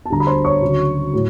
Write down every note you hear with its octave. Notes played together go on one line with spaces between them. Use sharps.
A5
D2 D3 G3 A#5
B5
C5 C6
C#5 C#6
D2 C#3 F#3
A2 F#3